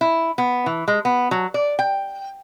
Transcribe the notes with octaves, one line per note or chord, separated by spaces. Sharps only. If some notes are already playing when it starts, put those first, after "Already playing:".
E4
B3
E3
G#3
B3
F#3
D5
G5